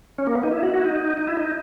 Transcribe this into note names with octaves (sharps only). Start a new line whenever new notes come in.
C#4
A#3
B3
D#4
E4
F#4
F#4
E4
D#4
D#4
E4
D#4